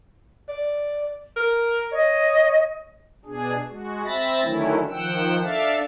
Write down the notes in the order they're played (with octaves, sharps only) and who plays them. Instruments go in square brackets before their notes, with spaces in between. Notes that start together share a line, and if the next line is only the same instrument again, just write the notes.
[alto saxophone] D5
A#4
[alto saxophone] C#5 [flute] D#5
[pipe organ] B2 D4 G#4
G#3 F#4
C4 E5 B5 A6 A#6
D3 D#3 F#3 A3 C#4 E4
D#3 F3 F#5 G5 E6
D4 A4 D5 E5 F5 A5